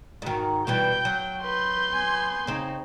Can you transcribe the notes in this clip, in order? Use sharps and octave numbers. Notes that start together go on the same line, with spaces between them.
G#2 D#3 F#4
B2 E3 G3 G5 G6
F#3
B4 C6 G6
B3 G#5
C#3 C4 D#4